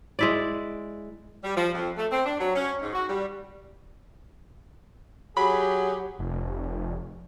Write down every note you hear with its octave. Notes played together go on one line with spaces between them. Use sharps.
G#3 E4 D5
G3
F3
F2
A3
C4
D4
F#3
C#4
G#2
F#4
G3
F#3 G4 G#4 B5
F1